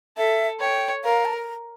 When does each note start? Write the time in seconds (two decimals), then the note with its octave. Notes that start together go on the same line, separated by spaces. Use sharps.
0.17 A4 E5
0.60 C#5 G5
1.04 A#4 F5
1.25 A5
1.33 A#5